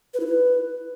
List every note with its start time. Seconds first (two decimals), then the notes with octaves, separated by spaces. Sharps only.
0.14 B4
0.20 E4
0.26 B4